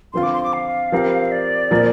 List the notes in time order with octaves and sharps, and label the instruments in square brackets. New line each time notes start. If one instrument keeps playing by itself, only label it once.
[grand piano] D3 F3 C4 F4 [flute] C6
[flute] D6
C6
D6
F5
[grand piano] F3 C4 G4 A#4
[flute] D5
[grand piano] A#2 F3 A#3